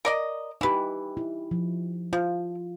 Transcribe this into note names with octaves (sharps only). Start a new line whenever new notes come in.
A#4 D5 D#5
E3 D#4 G4 B4
E4
F3
F3 F4